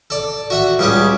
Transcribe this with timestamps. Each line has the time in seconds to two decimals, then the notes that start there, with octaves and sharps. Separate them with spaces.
0.10 A4 D5
0.50 F#4 E5 F#5
0.79 C#2 G3 C#4 G#4 A5 D6